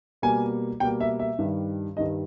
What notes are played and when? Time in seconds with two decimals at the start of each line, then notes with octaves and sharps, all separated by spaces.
0.22 B2 G3 A#3 G#5
0.80 B2 G3 A#3 G5
1.00 E5
1.19 E5
1.38 G2 D#3 G3
1.97 G2 D#3 G3 D#5